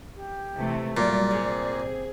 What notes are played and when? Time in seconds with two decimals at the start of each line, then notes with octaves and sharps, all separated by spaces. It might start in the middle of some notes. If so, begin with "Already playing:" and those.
0.15 G4
0.58 C3 E3 A3
0.97 A#2 F#3 G3 A3 A#3 D5
1.31 C3 G#4